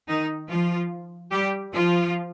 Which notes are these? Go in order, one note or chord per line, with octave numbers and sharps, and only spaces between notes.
D#3 D#4
F3 F4
G3 G4
F3 F4